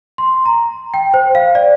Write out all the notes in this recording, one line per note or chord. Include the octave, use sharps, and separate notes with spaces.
C6
A#5
G5
C5
F5
D5